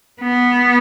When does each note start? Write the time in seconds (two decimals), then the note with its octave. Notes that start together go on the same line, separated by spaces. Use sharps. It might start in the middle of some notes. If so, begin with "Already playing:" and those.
0.21 B3